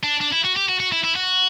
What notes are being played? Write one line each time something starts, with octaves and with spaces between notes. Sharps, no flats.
D4
D4
E4
F#4
G4
F#4
F#4
E4
E4
F#4